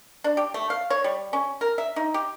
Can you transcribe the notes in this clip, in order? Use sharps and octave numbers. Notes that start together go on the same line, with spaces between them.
D4
G4
A3
F5
C#5
G3
C#4
A#4
E5
D#4
G4